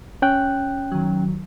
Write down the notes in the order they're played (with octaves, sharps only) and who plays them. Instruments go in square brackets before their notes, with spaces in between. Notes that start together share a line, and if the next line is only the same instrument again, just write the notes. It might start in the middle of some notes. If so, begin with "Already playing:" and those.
[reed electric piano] C#4 G5 F#6
[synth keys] D#3 F#3